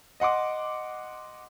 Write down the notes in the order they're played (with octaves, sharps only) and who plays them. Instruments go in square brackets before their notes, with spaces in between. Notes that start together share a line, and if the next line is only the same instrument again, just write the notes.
[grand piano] D#5 F#5 C6 D6